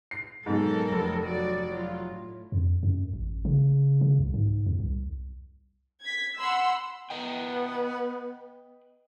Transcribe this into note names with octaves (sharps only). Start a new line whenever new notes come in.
C7
G#2 B2 F#3 A4 A#4
F1
F#3 F#4 D5
F#3 F4
A2
F2
F#2
A1
C#3
C#3
C2
G#2
E2
C2
G#6 B6
F#5 B5 C6 E6
B3 B4 D#5 G5